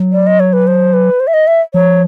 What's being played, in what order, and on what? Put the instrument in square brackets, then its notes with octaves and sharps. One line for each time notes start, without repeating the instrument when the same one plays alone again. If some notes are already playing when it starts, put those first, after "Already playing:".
Already playing: [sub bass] F#3
[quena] D5
D#5
C#5
B4
C5
B4
C5
E5
D#5
E5
[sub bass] F3 [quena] C#5